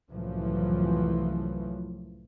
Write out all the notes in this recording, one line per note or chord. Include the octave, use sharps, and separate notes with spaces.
C2 F#2 A2 E3 F3